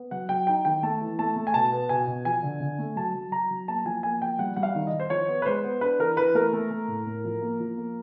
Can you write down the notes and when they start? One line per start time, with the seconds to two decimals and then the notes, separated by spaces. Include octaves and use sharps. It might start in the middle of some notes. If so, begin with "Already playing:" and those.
Already playing: B3
0.11 F#3 F#5
0.29 F#3 G5
0.47 D#4 G5
0.65 D#3 G5
0.83 A3 A5
1.01 E3
1.18 A3 A5
1.36 A3
1.47 G#5
1.54 B2 A5
1.73 B3
1.89 B2 G#5
2.07 B2
2.25 F3 G#5
2.43 D3
2.60 D3
2.78 A3
2.96 F#3 A5
3.15 F#3
3.32 F#3 A#5
3.51 F#3
3.68 A#3 A5
3.85 F3 G#5
4.03 A#3 G#5
4.22 F3 G5
4.39 G3 F#5
4.56 G3 F#5
4.63 F5
4.75 D#3
4.87 D#5
4.92 D#3
5.00 C5
5.10 F3 C#5
5.28 B3
5.42 B4
5.46 G#3 C5
5.64 B3
5.81 D4 B4
5.99 E3 A#4
6.17 E3 B4
6.34 A3 A#4
6.53 A3
6.71 A3
6.88 A2
7.06 A2
7.25 F3
7.42 A#3
7.60 F3
7.78 A#3